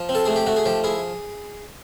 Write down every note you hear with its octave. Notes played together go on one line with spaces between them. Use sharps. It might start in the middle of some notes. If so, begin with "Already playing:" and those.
Already playing: F3
C4
A4
A3 G#4
G4
A3 F#4
G#4
F3 G4
E4 G#4